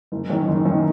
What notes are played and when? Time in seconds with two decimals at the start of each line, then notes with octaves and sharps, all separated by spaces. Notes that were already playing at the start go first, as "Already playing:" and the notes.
0.12 F#1
0.29 F#2 D#3
0.47 F#1
0.65 F#2 D#3